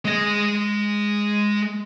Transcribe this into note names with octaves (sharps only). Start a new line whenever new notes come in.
G#3 D#5